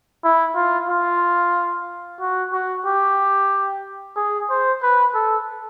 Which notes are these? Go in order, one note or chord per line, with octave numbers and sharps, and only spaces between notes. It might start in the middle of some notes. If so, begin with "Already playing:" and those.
E4
F4
F4
F#4
F#4
G4
G#4
C5
B4
A4